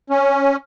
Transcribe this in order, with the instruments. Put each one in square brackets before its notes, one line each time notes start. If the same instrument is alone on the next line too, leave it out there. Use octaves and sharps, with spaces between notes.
[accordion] C#4